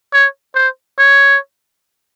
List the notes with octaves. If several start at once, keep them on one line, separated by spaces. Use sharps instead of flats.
C#5
C5
C#5